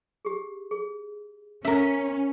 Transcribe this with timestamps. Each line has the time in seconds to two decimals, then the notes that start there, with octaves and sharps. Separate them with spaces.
0.25 G4 G#4
0.71 G#4
1.65 C#4 A#4 E5